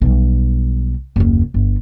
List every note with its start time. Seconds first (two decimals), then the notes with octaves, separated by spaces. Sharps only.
0.01 B1 G3
1.16 F#1 D#2
1.54 G1